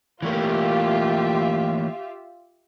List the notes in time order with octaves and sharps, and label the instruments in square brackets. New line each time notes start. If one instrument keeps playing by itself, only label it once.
[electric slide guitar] E3 A3 A#3 [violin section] F4 G4 E5